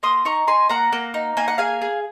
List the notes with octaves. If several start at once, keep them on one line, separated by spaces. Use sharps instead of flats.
A#3 C6 D#6
D#4 A#5 C#6
D#4 G#5 C6
A#3 F#5 A#5
A#3
D#4
A#3 G#5
F#5
G#4 F5 G#5
G#4